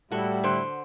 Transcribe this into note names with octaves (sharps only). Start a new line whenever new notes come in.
A2 G3 E4 F#4 A4
D3 C5